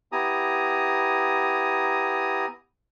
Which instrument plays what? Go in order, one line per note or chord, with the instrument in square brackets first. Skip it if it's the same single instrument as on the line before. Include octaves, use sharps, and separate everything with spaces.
[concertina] B3 E4 G4 G#5 A#5 D#6